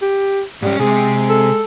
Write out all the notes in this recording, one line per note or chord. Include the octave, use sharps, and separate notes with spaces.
G4
G#2 G3 C#4
C3 G#3 C4 G#4
A4